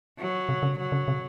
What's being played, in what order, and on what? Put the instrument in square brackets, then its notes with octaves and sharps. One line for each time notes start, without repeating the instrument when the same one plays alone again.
[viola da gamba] F#3
[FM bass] C3
C#3
[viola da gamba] F#3
[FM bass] C#3
C3